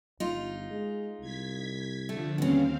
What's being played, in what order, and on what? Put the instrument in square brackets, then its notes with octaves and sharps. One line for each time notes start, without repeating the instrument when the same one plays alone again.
[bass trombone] G1 [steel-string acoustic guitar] D#4 F4
[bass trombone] G#3
[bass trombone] C2 [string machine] G#6 B6
[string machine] D3 F3 [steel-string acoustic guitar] A3
[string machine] D#2 C4 F5 [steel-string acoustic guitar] C#3 B3 [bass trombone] G3